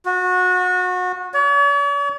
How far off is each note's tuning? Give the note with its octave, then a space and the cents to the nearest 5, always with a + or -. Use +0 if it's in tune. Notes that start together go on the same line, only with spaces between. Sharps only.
F#4 -25
C#5 +45